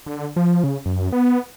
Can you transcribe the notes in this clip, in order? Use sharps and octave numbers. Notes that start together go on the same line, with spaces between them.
D3
F3
C#3
F#2
B3